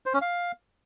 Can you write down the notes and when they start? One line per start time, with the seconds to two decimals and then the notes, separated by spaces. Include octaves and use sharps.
0.06 C5
0.14 C#4
0.22 F5